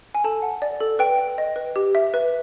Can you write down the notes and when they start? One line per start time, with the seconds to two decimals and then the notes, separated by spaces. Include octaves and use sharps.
0.14 G#5
0.24 A4 A5
0.42 F#5
0.62 D5
0.80 A4
0.99 B4 G5
1.18 G5
1.38 D#5
1.56 B4
1.76 G4
1.95 E5
2.14 B4